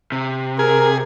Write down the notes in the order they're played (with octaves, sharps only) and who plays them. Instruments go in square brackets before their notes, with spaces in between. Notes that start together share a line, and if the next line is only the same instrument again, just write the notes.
[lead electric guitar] C3
[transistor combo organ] G#4 [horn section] A#4